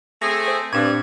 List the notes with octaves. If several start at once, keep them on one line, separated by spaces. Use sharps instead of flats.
A3 C4 G#4 A#6
C5
G2 A#2 C4 D4 G#6